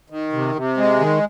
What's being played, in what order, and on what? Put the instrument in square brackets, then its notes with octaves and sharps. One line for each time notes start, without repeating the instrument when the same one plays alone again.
[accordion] D#3
C3
C3
G#3
D#3